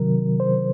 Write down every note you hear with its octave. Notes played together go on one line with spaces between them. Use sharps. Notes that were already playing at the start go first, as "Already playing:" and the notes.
Already playing: C3 D#3 F#3 A#4
C5